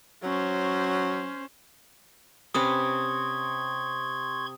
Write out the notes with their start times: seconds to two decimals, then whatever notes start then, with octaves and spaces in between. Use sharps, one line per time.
0.23 F#3 C#4 C5
2.54 C3 C#4 B4 C6 C#6 D#6 G#6